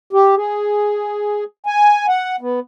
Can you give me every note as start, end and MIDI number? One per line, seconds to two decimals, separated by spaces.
0.13 0.35 67
0.36 1.44 68
1.66 2.06 80
2.08 2.36 78
2.41 2.60 59